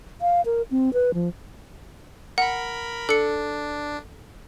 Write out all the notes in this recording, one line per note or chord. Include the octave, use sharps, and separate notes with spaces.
F5
A#4
C4
B4
F3
A#4 F#5 B5
D4 A4 C#7